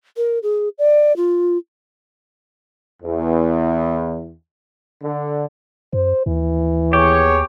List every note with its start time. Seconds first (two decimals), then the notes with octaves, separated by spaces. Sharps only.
0.17 A#4
0.43 G#4
0.79 D5
1.17 F4
3.02 E2
5.02 D3
5.93 F#2 C5
6.26 D#2 E3
6.93 B3 G4 G#4 C#5